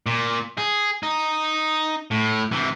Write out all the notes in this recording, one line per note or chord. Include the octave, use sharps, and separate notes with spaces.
A#2
G#4
D#4
A2
C3 E3